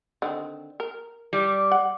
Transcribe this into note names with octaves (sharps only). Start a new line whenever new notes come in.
D3 D#3 C4
A#4
G3
F#5